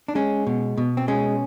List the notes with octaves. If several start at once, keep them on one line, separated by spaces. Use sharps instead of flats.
D4
G#3 C#4
B2
B2
C4
G#3 C#4